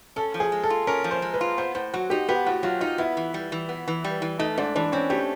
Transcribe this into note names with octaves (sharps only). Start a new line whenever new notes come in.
C#4 A4
F3
G#4
G#3
A4
F4
C#4 A#4
F3
C5
G#3
B4
F4
B3 C5
A2 C5
F#3 F#4
D#4 G4
B3 G4
A2 F#4
F#3 F4
D#4 F4
B3 E4
E3
G3
E3
B3
E3
G3
E3
A3 D#4
G#2 D4
E3 D4
C4 C#4
A3 G4